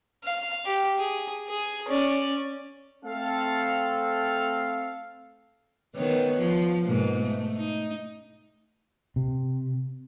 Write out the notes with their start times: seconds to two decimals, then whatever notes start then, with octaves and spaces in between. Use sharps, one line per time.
0.24 F5
0.65 G4
0.98 G#4
1.48 G#4
1.87 C#4 D5
3.05 A3 C4 A4 F5
5.96 D#3 B3 C#5
6.37 F3
6.87 G#2 B2 A#3
7.22 A3
7.56 D#4
9.16 C3